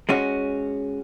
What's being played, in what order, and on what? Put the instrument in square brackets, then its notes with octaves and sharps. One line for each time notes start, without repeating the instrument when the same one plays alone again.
[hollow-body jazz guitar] G#3 C#4 F#4